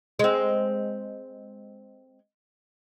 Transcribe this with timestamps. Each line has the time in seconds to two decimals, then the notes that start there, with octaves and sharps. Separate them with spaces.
0.19 G#3 C4